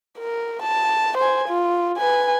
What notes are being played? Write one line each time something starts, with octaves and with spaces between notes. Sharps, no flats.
A#4
A5
C5 G#5
F4
B4 G#5